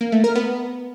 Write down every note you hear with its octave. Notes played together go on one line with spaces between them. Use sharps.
A#3
A3
A#4
B3